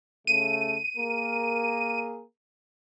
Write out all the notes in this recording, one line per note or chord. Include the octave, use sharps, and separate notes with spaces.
C#3 A3 D#7
A#3 G#4 A#4